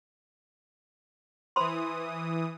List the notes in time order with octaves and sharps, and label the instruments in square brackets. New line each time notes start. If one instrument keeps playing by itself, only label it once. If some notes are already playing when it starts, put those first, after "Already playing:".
[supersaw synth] E3 D#6 [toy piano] C5 B5 C6